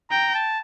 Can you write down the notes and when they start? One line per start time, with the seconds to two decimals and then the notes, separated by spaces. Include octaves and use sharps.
0.10 G5 A#5
0.34 A5